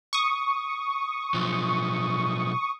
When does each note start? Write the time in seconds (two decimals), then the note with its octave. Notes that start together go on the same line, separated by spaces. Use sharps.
0.13 C#6 D#6
1.34 B1 F3